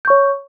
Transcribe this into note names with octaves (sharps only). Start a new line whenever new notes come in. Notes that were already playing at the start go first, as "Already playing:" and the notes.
C#5 C#6 G6